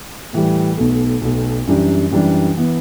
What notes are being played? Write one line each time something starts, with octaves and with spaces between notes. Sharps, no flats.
A2 E3 G3
B1 B2 A3
B1 B2 A3
F#2 E3 G3 D4 G4
F#2 E3 G3 D4 G4
E3 B3